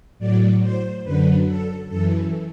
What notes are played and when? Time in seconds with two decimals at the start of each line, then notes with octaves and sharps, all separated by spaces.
0.19 A2 F#3 D5
0.61 C5
1.03 F#2 D3 F#3 B4
1.47 A4
1.89 F#2 E3 A4